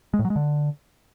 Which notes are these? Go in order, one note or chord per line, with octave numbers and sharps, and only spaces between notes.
G#3
A2
F#3
G#3
D3